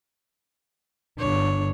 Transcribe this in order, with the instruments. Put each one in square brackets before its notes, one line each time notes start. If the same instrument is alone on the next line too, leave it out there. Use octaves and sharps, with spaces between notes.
[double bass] G1 D4 [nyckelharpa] C#5